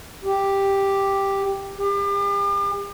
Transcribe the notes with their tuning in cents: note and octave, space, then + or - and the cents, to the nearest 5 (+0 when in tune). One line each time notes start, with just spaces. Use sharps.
G4 +5
G4 +40